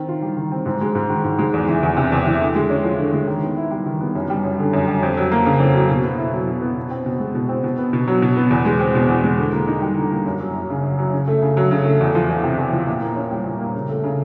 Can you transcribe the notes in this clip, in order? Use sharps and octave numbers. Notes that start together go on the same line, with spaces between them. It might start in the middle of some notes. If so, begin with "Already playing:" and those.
Already playing: D#3 C4
F4
G3
D#3
C4
G#2
G#3
G#2
D#3
G#2
G#3
E2
E3
E2
C3
E2
E3
D3
G#3
C#4
F3
D3
G#3
D#3
B3
E4
G3
D#3
B3
F#2
G3
F#2
D3
F#2
G3
F2
F#3
A#3
C#3
F2
F#3
B2
B3
E4
F#3
B2
B3
B2
C4
B2
G#3
B2
C4
B2
B3
B2
F#3
B2
B3
E2
G#3
C4
B2
E2
G#3
D3
A#3
D#4
G3
D3
A#3
F#2
F#3
F#2
C#3
F#2
F#3
C#3
A3
C#3
F#3
C#3
A3
E2
F3
E2
C3
E2
F3
A#2
A#3
C#4
G3
A#2
A#3
C#3
A3
C#3